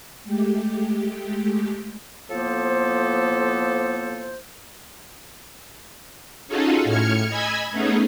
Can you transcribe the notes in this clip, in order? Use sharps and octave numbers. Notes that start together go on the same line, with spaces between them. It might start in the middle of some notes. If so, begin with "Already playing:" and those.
G#3 A3 G4
A2 F3 A#3 B3 A4 C5
C#4 D#4 F4 F#4 G#4 A4
A2 F6 G#6 C#7
D#5 G#5 B5 E6 G#6
A3 B3 C#4 D#4 G#4